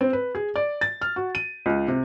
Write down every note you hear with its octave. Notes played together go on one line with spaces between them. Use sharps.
C4
B4
G#4
D5
A6
F6
F#4
D#7
C#2
C3